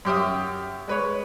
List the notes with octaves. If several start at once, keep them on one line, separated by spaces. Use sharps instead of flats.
F#2 G4 E5 D#6
G#3 B4 C#5